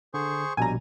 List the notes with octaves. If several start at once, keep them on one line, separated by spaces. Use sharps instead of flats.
D3 G#4 C5 C#6
A#1 B2 G3 G#5 A#5